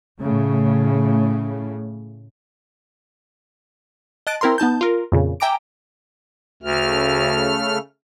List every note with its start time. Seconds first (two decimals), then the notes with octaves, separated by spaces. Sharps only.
0.21 A2 C#3
4.27 D#5 A5 F#6 A6 D7
4.41 C4 E4 A#4 A#5 C6
4.58 B3 D#4 A5 G6
4.81 F4 A#4
5.12 F2 A#2 C#3
5.40 E5 G5 G#5 A#5 D6 D7
6.63 D2 C#3 A3 F6